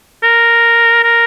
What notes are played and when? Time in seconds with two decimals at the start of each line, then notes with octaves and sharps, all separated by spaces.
0.23 A#4
1.04 A#4